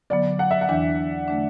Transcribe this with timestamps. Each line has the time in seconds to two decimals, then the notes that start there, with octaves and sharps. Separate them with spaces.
0.10 D3 F#3 B3 D5
0.39 F#5
0.51 E5
0.61 F#5
0.69 E2 E3 D4
1.28 D3 A3 D4